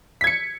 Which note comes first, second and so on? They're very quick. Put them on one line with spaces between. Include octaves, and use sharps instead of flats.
B6 G#6 C#7